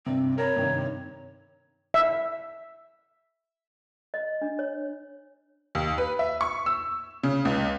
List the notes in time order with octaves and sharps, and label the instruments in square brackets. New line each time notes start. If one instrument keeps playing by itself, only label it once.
[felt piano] G2 C3 [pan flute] C4
[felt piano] A#4 A#5 B5 [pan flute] C#5
[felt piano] G2 C3 D#3
[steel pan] E5
[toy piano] D#5
D4
C#5
[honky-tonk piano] D#2
B4
E5
C#6
E6
C#3
C#2